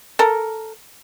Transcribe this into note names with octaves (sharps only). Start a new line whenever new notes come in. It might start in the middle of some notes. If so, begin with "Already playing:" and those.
A4 A#4